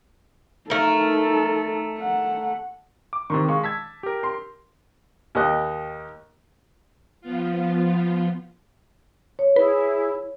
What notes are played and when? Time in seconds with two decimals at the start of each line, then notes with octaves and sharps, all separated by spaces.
0.70 A3 D#4 A4 A#4
1.98 F#5
3.13 D6
3.30 C3 D#3 C6 C#6
3.48 G#3 F5 C#6
3.63 A5 E6 G#6 B6
4.03 G4 A#4
4.23 C6
5.35 D#2 G4 D#5 F#6
7.21 F3 B3 F4
9.39 C#5
9.56 E4 G#4 B4